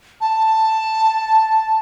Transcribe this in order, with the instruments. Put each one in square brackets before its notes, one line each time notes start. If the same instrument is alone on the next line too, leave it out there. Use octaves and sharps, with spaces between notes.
[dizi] A5